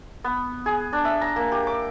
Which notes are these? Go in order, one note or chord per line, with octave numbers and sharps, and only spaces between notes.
B3
G#4
D4
E5
A#5
A#3
G4
D6